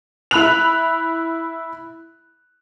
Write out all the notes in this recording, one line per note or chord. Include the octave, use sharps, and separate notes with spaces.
E4 B5 F#6 F7